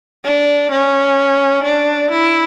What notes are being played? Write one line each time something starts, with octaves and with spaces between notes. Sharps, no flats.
D4
C#4
D4
E4